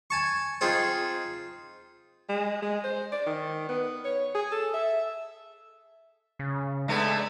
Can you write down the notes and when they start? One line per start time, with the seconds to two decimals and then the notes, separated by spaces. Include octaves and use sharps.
0.10 G#5 A5 C#6
0.61 C4 D#4 F4 G#4
2.29 G#3
2.62 G#3
2.84 C5
3.12 D5
3.26 D#3
3.69 B3
4.05 C#5
4.35 G#4
4.52 A4
4.74 E5
6.39 C#3
6.88 D3 G#3 A3 B3